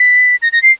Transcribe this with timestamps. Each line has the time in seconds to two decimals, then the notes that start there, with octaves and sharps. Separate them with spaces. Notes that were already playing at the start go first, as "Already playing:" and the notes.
Already playing: B6
0.42 A#6
0.52 A#6
0.63 C7